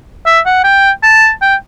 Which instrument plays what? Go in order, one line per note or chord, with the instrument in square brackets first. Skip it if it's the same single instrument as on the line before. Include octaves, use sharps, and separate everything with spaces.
[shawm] E5
F#5
G5
A5
G5